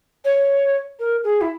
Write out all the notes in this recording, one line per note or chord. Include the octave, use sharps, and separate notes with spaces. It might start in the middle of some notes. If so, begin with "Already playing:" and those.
C#5
A#4
G#4
E4